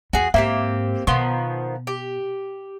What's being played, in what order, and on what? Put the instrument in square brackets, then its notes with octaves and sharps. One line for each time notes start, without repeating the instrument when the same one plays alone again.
[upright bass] E2 [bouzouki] F#4 G#4
[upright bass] G#2 [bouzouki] A#3 C4 G4 [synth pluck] E5
[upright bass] B2 [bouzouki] D#3 F3 B3 [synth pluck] C6
[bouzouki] G4